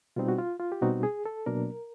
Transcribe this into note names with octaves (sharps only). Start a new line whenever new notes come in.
B2 G3 C4 D#4 F4
F#4
F4
F4
G4
B2 G3 C4 D#4 F#4
G#4
A4
B2 F#3 A#3 D4 A#4